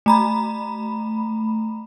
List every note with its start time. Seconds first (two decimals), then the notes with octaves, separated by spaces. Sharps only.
0.06 A3 A#5 B5